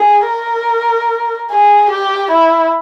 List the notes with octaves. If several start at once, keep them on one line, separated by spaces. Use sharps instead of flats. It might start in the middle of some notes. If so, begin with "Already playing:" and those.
Already playing: G#4
A#4
G#4
G4
E4